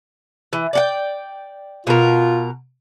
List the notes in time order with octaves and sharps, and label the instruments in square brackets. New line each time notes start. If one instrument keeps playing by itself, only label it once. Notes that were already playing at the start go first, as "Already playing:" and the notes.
[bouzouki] E3
D5 F#5 G5
[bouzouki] B2 A#4 [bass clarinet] F4